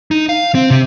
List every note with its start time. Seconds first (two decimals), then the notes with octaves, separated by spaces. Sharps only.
0.11 D#4
0.29 F5
0.55 C4
0.70 C3